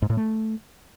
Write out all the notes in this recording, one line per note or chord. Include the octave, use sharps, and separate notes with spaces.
G#2
A2
A3